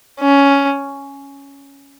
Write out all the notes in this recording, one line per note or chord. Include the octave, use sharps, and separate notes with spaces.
C#4